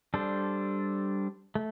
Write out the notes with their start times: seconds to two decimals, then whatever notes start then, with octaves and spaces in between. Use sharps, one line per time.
0.14 G3 D4 A4 C5
1.55 A3